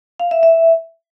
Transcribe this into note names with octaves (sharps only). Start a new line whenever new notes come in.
F5
E5
E5